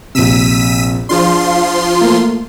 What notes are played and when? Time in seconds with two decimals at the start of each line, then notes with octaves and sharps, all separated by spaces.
0.15 A#1 C3 E6 B6 D#7
1.09 F3 D4 F4 G#4 C6
2.01 A3 A#3 A#4